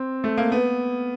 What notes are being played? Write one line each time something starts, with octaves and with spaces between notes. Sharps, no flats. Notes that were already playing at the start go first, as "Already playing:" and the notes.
Already playing: C4
A3
A#3
B3